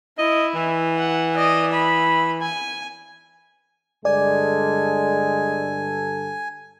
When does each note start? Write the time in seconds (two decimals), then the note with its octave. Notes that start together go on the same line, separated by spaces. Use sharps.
0.18 E4 D#5
0.55 E3
0.97 F#5
1.35 D5 D#5
1.72 B5
2.42 G#5
4.05 G2 D3 G#3 A4 D5 G#5